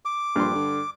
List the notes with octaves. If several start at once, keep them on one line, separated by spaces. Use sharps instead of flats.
D6
A#1 G2 C6
D3